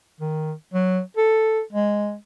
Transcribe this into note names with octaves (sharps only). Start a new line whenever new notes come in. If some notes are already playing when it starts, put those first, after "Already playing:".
D#3
F#3
A4
G#3